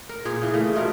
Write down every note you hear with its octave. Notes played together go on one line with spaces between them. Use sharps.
A#4
A#2 C#4 G#4 C#5
C#3 E3
C#3 A3 D#4
B2 F3 A3 A#4